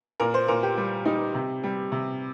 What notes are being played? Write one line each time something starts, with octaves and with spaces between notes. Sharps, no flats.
A#2 A#4
C5
A#2 A#4
G4
G3
G3 D#4
C3
G3
C3